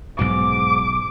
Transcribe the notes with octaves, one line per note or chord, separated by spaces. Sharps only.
B1 G#2 B2 D6